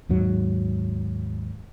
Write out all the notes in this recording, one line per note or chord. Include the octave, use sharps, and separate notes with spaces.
D#2 G#2 F#3